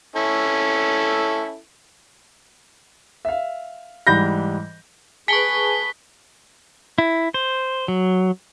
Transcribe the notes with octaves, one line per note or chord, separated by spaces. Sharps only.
C#4 E4 A4
E5 F5
G#2 E3 G3 B5 G6 A#6
G#4 B4 G#5 A5 C#6 B6 G7
E4
C5
F#3